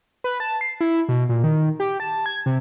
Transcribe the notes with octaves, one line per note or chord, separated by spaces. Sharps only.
B4
A5
C7
E4
B2
A#2
D#3
G4
A5
G#6
C3